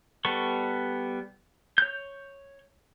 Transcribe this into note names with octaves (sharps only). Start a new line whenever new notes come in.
G3 B3 A4 C#6
C#5 G6